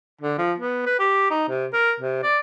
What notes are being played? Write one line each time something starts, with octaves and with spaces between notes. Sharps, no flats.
D3
F3
B3
B4
G4
D#4
C3
A#4
C3
D5